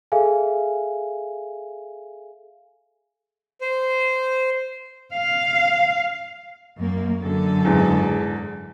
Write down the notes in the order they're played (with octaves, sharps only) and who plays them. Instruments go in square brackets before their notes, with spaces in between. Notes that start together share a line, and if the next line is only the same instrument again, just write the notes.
[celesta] G#4 A4 E5 F5 G#5
[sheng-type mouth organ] C5
[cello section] F5
F#2 A#3
F#2 D3 A4
[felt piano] E2 G#2